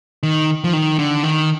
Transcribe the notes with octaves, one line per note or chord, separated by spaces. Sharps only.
D#3
F3
D#3
D3
D#3